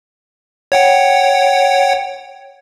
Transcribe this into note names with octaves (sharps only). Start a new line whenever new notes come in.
C#5 F#5 G5